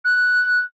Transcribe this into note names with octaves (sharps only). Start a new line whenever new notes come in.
F#6